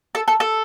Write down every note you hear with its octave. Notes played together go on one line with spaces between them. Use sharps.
A4
A4
A4